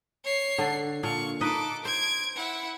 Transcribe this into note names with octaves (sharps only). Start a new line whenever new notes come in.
C#5 C7
D3 D4
A#2 D4 F5 C#6
D#4 A4 B4 D#5 D6
C5 G#6 D7
E4 F#5